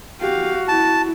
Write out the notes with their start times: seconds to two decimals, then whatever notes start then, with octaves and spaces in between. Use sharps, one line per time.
0.21 F#4 G4 F5
0.68 E4 A5